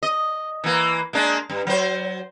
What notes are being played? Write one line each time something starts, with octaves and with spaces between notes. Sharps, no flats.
D#5
E3 A#3
G#3 A#3 D4
G2
F#3 C5